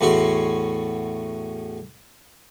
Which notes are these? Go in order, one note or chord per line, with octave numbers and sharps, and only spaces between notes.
E2 A2 F#4 C6